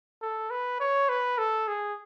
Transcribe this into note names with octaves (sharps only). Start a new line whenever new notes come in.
A4
B4
C#5
B4
A4
G#4